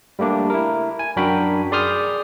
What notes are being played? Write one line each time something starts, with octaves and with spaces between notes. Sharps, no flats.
G3 A3 A#3 D4 G4
E4 A#4
G#5
F#2 D4 F#4 A#4 G5 B5
G#4 D5 C6 D#6 F6 G6